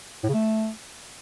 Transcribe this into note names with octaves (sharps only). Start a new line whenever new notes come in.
A2
C#3
A3